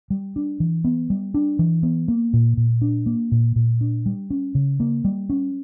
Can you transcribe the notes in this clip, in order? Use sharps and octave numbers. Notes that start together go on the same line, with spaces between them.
G3
D4
E3
B3
G3
D4
E3
B3
A#3
A#2
A#2
D4
A#3
A#2
A#2
D4
G3
C#4
C#3
A#3
G3
C#4